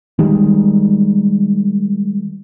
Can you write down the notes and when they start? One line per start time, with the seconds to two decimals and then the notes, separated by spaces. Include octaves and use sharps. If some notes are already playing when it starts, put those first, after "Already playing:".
0.19 D#3 G3 G#3